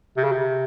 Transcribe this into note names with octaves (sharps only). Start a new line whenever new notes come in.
C3
C#3
C3